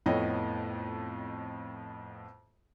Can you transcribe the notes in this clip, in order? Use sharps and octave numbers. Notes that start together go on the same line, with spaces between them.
F2 A2 B3 C#5 D#5 G5